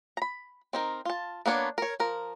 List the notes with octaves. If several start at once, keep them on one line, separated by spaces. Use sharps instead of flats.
A#5 B5
C4 D#4 A#4
F4 A5
A#3 B3 D4 C#5
A#4 C#5
F3 A#4